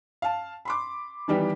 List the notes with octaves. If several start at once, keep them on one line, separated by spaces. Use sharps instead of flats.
F5 A5
B5 C6 D6
D#3 E3 G3 B3 G4